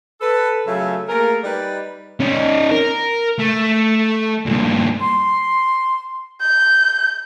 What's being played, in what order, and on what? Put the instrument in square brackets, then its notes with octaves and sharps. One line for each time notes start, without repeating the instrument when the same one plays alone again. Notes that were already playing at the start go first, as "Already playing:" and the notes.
[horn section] A4 B4
C#3 F#3 A3 F4 E5 G#5
A3 A#3 G#4 A#4
G3 D#4 B4 D5
[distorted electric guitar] C#4 D#4
A#4
A3
G2 A#2
[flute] C6
[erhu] G6